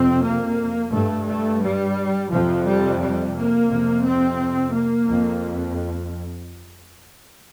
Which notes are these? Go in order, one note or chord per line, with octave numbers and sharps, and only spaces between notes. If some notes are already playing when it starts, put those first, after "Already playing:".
Already playing: F2 C3 C4
A#3
G2 A3
A3
G3
F2 C3 F3
G3
G3
A#3
F2 C3
C4
A#3
F2